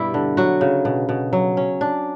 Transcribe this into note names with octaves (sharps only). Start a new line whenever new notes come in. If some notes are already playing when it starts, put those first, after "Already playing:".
Already playing: G2 B2 G3 E4 D5
D3
F#3 F#4
C#3
B2
B2
F#3
C#4
D4